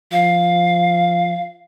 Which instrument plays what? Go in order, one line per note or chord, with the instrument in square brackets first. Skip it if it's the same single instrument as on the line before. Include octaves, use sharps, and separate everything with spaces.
[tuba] F3 [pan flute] F5